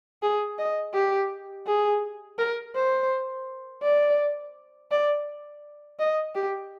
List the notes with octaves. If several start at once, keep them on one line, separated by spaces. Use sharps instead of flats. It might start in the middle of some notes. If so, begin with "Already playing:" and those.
G#4
D#5
G4
G#4
A#4
C5
D5
D5
D#5
G4